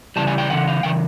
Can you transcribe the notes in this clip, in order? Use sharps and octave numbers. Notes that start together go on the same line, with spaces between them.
C#3 E3 G3 A5
G#5
G5
C#3 E3 F#5
F5
C#3 E3 G5